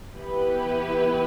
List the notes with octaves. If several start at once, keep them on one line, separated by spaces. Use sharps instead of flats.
E3 B3 E4 G4 B4